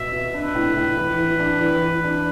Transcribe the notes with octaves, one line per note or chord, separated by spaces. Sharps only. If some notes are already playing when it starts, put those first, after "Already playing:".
Already playing: B2 B3 E5
B2
D4 B4
A2
A2
E3
E3
D4
E3
E3
D4